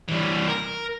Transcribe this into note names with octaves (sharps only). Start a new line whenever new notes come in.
E3 G3
A#4